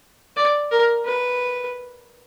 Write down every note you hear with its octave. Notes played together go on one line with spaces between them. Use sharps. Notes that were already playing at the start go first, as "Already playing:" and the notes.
D5
A#4
B4